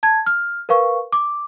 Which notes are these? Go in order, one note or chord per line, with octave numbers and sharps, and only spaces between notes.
A5 G#6
F6
A#4 B4 F5 C#6
D6